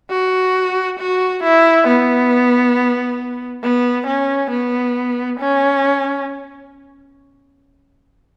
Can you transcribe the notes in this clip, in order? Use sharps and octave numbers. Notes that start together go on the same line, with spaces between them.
F#4
F#4
E4
B3
B3
C#4
B3
C#4